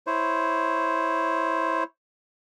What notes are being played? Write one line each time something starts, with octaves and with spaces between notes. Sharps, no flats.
E4 C5 C#5